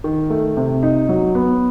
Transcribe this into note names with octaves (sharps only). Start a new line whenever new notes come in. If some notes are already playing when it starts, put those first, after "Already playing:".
D#3
A3
C3
D#4
F#3
B3